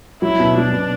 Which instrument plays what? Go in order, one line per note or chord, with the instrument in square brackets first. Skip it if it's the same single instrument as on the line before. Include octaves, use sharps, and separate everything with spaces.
[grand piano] F#3 [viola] E4
[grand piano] B2
[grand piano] F#3 [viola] D4
[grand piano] B2